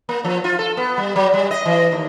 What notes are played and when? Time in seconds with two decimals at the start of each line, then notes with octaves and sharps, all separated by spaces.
0.09 A#3
0.24 F3
0.44 F4
0.59 A4
0.77 B3
0.98 G3
1.16 F#3
1.34 G3
1.51 D#5
1.66 E3
1.92 D#2